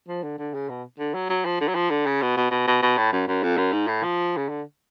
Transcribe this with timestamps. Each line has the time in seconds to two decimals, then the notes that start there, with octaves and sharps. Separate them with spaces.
0.08 F3
0.23 D3
0.38 D3
0.54 C#3
0.69 B2
0.99 D3
1.14 F#3
1.29 F#3
1.45 F3
1.61 D3
1.68 F#3
1.75 F3
1.90 D3
2.06 C#3
2.21 B2
2.37 B2
2.51 B2
2.67 B2
2.82 B2
2.98 A2
3.13 F#2
3.28 F#2
3.43 F2
3.57 F#2
3.72 G#2
3.88 A2
4.03 F3
4.37 C#3
4.49 D3